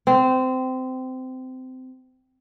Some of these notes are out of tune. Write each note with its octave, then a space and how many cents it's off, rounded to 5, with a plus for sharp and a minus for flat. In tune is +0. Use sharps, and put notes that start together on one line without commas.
C4 -20